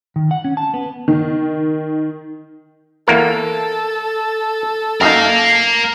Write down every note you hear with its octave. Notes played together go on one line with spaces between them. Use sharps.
D#3
F#5
C#4
A5
B3
D#3
E2 A#3 A4 A#4
F#2 D#4 A#4 F5